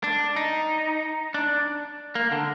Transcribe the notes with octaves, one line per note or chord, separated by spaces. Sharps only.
D4
D#4
D4
A#3
D3